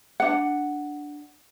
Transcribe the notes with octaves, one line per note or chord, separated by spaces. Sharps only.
D4 F#5